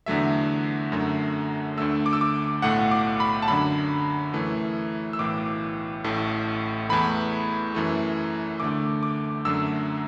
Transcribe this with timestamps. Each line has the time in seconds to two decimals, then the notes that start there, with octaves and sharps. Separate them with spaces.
0.06 E2 D3 F#3 A3 E5
0.92 F#2 D3 F#3 A3
1.77 D2 D3 A3 E6
2.06 D6
2.13 E6
2.21 D6
2.62 B1 A2 A3 F#5
2.91 D6
3.20 B5
3.42 A5
3.48 F#2 D3 F#3 B5
4.34 F#2 E3 A3
5.13 E6
5.19 B1 A2 E3 D6
6.04 A1 A2 A3
6.89 E2 E3 A3 B5
7.75 F#2 E3 A3
8.60 D2 D3 A3 D6
9.03 D6
9.45 F#2 D3 F#3 A3 E6